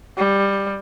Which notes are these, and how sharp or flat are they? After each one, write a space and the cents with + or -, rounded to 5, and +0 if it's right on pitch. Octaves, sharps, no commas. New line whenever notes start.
G3 +10